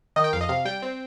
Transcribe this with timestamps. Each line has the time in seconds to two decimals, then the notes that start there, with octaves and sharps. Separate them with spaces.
0.16 D#3 D#5
0.24 G5
0.33 F2 F5
0.41 D#5
0.49 C3 F5
0.65 G3 G5
0.82 C4